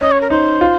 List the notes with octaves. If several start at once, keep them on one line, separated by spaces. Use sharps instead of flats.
C#4 D#5
C#5
A#4
D#4 C5
F4